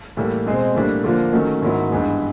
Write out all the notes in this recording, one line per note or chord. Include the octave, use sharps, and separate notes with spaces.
A2 E3 G3 A#3
B2 G#3 C4
A2 E3 G3 A#3 D4
D3 F3 A#3 D4
D#3 F#3 A3 C#4
G#2 D#3 F#3 B3 E4
G2 E3 G#3 B3